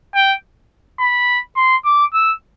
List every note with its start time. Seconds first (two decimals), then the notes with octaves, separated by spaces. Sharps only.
0.15 G5
1.00 B5
1.56 C6
1.85 D6
2.14 E6